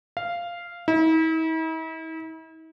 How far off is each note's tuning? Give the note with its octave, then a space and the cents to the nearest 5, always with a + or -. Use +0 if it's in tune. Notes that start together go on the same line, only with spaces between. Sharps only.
F5 -10
E4 -45